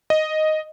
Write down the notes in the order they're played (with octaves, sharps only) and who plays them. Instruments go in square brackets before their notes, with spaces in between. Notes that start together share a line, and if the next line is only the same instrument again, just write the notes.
[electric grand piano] D#5